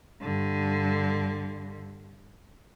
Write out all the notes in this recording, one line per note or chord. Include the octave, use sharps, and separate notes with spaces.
G2 D3